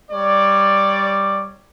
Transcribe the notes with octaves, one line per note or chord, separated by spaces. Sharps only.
G3 C#5 D5